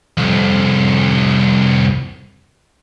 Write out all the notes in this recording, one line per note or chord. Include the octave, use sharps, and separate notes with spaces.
C2 F2